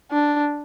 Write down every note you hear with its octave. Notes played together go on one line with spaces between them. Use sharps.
D4